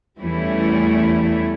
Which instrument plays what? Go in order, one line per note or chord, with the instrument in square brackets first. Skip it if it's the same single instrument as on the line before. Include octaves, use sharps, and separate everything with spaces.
[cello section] E2 E3 G3 A3 C#4 E4